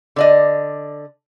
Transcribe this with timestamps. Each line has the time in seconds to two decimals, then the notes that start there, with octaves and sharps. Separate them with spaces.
0.16 D3 D5 D#5